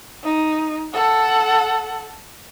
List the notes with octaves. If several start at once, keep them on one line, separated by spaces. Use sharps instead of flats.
D#4
A4 F#5